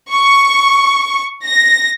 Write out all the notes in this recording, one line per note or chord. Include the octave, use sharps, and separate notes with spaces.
C#6
A#6